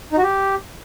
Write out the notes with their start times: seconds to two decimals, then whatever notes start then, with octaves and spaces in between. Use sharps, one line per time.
0.12 D#4
0.18 F#4
0.23 G4